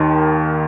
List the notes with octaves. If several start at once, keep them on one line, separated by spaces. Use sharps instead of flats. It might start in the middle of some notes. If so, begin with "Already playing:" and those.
Already playing: D#2 D#3